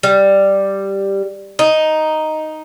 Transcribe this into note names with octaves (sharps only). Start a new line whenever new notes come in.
G3
D#4